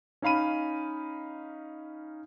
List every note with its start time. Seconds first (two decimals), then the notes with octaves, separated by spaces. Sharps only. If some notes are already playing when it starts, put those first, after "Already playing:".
0.22 C#4 D#4 F5 B5 D#7